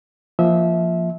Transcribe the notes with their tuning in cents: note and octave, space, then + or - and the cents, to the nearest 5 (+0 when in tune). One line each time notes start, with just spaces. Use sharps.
F3 -15 A#3 +0 E5 -25